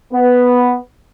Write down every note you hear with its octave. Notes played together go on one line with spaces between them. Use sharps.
B3